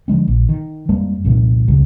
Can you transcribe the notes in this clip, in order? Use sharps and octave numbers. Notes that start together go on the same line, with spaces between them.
D3 F3 G#3 C4
A#1
D#3
F2 G3 G#3 A#3
C2 F2 A#2 D#3
E1 C#2 C#3 F#3